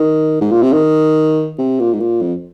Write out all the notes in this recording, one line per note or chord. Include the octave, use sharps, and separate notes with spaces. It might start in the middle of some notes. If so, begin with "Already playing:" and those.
Already playing: D#3
G#2
A#2
C3
D#3
C3
A#2
G#2
A#2
F2